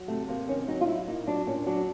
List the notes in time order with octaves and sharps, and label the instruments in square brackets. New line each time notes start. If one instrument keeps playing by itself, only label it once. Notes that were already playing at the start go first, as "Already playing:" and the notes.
Already playing: [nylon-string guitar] F#3
C3 A3
C3 A#3
D#3 C#4
F#3 D#4
F4
F#3 E4
A#2 D#4
F#3 D4
A#2 C#4
F#3 D4